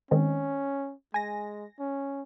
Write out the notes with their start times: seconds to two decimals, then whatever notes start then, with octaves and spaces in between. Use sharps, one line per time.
0.11 D#3 G#3 C4 C#4
1.14 G#3 G#5 A#6
1.79 C#4